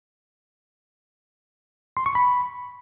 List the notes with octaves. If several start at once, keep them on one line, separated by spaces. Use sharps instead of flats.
C6
C#6
B5